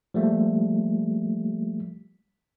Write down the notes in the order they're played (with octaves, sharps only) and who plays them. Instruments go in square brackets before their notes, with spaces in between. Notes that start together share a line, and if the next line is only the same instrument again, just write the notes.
[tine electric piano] F3 G3 A3 A#3